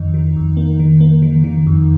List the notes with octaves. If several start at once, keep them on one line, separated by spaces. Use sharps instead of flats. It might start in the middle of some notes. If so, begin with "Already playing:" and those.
Already playing: F2 D#3 D#4
D#3
F2
A#3
D#3
A#3
D#3
D#3
F2